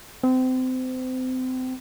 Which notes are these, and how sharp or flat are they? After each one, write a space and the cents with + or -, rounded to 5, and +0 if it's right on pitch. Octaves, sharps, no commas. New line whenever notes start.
C4 -30